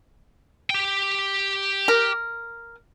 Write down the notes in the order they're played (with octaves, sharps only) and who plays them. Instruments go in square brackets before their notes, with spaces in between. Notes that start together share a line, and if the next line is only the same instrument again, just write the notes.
[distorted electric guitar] G4 G5
[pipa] A#4